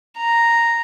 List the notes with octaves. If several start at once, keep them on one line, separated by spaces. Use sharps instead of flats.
A#5